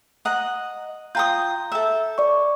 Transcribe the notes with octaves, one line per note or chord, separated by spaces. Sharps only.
D#5 F#5 A#5
F4 G5 A#5 D#6 G6
A4 E5
D5 C#6